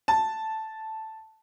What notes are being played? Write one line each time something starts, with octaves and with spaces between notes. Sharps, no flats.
A5